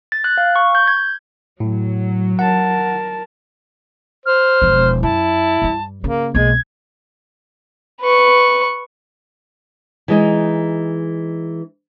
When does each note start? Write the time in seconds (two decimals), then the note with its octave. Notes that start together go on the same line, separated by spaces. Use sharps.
0.12 A6
0.24 F#6
0.38 F5
0.56 C#6
0.75 G6
0.88 G#6
1.60 A2 F#3
2.39 A#4 F#5 A5
4.26 C5 F6
4.62 E1 F3
5.03 F#2 E4 A5
5.62 G2 G3
6.04 C#3 A#3
6.35 B1 G#3 A#3 G#6
8.01 B4 C#6
10.08 E3 G#3 D#4